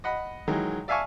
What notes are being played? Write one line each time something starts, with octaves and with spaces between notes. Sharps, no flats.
D#5 F#5 B5
D#3 E3 F#3 G#3
D5 E5 F5 G#5 A5 C#6